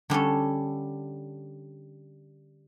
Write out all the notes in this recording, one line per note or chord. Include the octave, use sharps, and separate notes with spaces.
D3 G3 C#4 A4